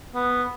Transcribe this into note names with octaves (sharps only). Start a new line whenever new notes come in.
B3